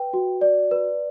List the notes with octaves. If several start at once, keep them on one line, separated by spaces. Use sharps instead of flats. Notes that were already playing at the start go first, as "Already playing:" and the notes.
Already playing: B4 G5
F#4
D5
B4